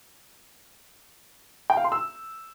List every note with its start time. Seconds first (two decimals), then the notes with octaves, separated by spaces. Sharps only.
1.70 G5
1.77 F5
1.84 C6
1.92 E6